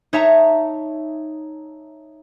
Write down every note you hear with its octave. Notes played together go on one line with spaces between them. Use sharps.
D#4 C#5 E5 A5 A#5